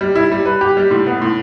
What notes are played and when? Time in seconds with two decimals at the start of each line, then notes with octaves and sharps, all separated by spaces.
0.01 G3
0.15 E4
0.31 G3
0.46 B4
0.61 G4
0.77 G3
0.91 A2
1.06 B3
1.21 A2